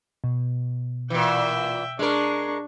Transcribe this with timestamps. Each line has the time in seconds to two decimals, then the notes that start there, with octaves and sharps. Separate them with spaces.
0.24 B2
1.10 A#2 E3 E5 G5
1.99 G#3 D4 A#4 C#6